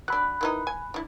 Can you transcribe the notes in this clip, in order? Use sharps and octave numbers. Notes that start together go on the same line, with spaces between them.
F#3 D4 B5 F#6
D#3 E3 D#4
G#5
D4 E4